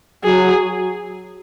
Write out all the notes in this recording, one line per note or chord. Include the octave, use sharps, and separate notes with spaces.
F#3 G#4